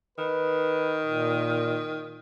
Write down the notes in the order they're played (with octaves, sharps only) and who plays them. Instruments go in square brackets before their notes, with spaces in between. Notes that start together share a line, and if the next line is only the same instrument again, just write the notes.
[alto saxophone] D#3 [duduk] B4
[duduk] A#2